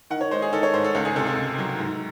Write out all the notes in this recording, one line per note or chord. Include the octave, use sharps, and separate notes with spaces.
D#3 F#5
C#5
G#3 C5
G#4
D#3 A4
C#5
G#2 C5
A4
C#2 A4
G#4
C3 A4
A4
C#2
F#3
G#2